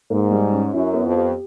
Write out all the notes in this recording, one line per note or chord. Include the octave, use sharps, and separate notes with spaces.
G#2 A#3
G3
C#4
F#2 E4
B3
F2
G4